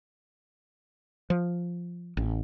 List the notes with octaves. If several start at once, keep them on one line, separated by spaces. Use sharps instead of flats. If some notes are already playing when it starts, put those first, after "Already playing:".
F3
A1